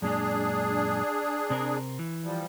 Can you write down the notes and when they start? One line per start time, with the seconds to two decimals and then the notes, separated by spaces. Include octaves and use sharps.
0.02 F#2 A#2 G#3 D4 G#4
1.50 C3 C4 A#4
1.99 E3
2.24 F3 G3